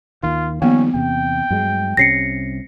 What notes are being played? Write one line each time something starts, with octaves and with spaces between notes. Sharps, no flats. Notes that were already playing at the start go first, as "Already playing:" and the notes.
D#2 D#3 F4
D#3 F3 G3 A#3 B3 C#4
E2 C3 G5
G2 F#3 G#3
C2 C3 C#4 A#6 C7 C#7